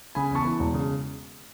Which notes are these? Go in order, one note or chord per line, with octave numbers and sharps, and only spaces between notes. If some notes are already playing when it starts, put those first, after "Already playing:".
C#3 G#5 B5
E2 A5 C#6
E3
E1
C#3